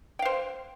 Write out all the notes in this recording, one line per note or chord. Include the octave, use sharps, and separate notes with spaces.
C5 F5 G5